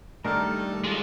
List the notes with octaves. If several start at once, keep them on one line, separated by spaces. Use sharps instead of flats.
D#3 G3 A3 D4 D#4 A4 A#4 F6
G#3 F4